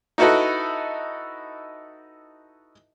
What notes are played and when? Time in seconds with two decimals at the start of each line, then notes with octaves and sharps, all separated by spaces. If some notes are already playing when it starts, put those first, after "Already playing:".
0.18 D#4 E4 F#4 A4 B4 D#5